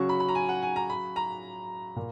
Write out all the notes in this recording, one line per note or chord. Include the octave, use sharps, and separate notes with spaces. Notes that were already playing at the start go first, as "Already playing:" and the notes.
Already playing: C#3 F#3 C#4 F#4 C#6
B5
B5
A#5
G#5
F#5
G#5
A#5
B5
A#5
A#2